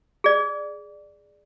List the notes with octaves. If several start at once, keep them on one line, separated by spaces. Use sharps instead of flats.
G#4 D5